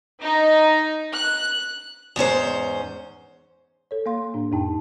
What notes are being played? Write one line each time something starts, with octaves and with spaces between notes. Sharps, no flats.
D#4
F#6
E2 G#2 C#4 C5
A4 C#5
A#3 F5 C6
A2 D4
F2 A2 D#4 G5 A5